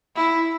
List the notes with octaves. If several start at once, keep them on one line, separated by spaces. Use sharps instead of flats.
E4